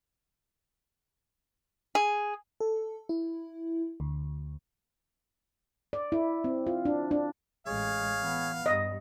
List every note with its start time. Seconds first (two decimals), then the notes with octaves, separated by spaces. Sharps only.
1.95 G#4
2.60 A4
3.09 E4
4.00 D2
5.93 D5
6.12 E4
6.44 C4
6.67 F4
6.85 D4
7.11 D4
7.66 A1 G#3 G#4 C#5 F5
8.20 E3 B3
8.66 G2 D#5